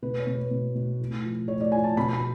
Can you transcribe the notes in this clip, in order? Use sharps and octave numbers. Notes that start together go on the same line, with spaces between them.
B2 B4
C#5
B2
B4
B2
B2
A2
F3
A2 C#5
D5
F3 G#5
A5
B2 B5
B5